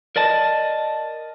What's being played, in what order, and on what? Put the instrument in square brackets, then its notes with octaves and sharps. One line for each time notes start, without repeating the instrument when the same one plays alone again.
[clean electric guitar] A#4 D5 D#5 A5